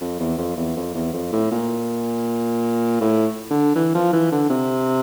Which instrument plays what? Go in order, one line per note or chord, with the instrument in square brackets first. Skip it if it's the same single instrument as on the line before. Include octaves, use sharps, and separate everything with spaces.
[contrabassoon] F2
E2
F2
E2
F2
E2
F2
A2
A#2
A2
D3
E3
F3
E3
D3
C3